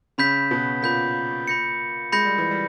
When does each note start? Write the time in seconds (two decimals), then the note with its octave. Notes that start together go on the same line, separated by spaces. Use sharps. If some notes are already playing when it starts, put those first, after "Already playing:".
0.18 C#3 C#4 B5 G6 B6
0.51 B2 B3
0.83 A#2 A#3 B5 G6 B6
1.47 B5 G6 A#6 C#7
2.12 G#3 B5 G6 A#6 C#7
2.25 G3
2.38 E3
2.51 G3